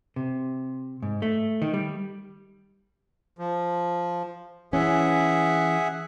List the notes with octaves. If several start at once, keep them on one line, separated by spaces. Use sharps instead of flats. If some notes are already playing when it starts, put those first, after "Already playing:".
C3
G#2
A3
D#3
G3
F3
E3 C#4 G#4 E5 F#5